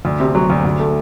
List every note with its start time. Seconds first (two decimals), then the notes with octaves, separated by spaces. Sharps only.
0.05 D2
0.20 C3
0.35 F#3
0.50 D2
0.65 D2
0.80 A3